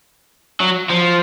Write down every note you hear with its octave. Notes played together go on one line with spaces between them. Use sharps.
F#3
F3